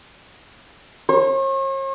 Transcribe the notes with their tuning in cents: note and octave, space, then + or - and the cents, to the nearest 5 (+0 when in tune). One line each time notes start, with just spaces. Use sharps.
C#5 -45